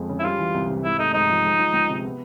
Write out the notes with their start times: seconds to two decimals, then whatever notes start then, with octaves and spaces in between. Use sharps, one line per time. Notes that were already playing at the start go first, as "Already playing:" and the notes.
Already playing: F2 F3 G#3
0.09 C#3
0.19 E4
0.24 G3 F4
0.39 E3
0.54 C2
0.69 C3
0.84 G#2 E4
0.98 A3 D#4
1.14 G#2 D#4
1.30 F3
1.45 G#3
1.59 F3
1.73 C#2
1.90 C3
2.05 B3